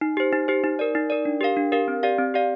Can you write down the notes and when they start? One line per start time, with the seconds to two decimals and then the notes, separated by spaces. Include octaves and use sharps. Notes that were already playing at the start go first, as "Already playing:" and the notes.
0.01 D#4
0.17 G4 C5
0.33 D#4
0.48 G4 C5
0.64 D#4
0.79 A#4 D5
0.95 D#4
1.10 A#4 D5
1.25 D4
1.41 G4 A#4 F5
1.57 D4
1.72 G4 A#4 F5
1.88 C4
2.03 G4 D5 F5
2.18 C4
2.34 G4 D5 F5